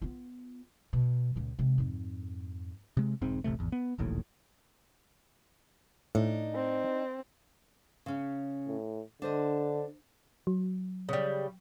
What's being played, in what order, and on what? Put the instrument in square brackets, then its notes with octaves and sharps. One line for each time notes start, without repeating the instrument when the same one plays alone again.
[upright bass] B3 F4
B2
C#2 A#2
C3 G#3
F2 G#2
[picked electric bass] C3 G#3
E1 G#2 C4
D#1 A1 C3 A3
G#1 E2
B3
E1 A#1 D#2 A2
[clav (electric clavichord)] A2 [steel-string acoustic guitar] D4 D#4
[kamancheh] C4
[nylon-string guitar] C#3 C#4
[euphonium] A2
[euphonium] D3 [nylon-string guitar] D4 C5 D#5
[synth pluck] F#3
[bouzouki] C#3 G3